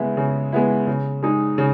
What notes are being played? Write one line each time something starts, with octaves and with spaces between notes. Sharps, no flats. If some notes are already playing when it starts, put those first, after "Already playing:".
Already playing: C#3 G#3 B3 E4
C#3
G#3 B3 E4
C#3
G#3 D#4
C#3